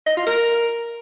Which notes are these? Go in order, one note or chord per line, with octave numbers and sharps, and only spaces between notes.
D#5
F4
A#4